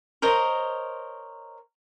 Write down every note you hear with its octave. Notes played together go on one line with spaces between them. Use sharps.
A#4 C5 C#5 D#5